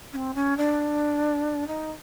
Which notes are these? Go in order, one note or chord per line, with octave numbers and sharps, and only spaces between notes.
C#4
C4
C#4
D4
D#4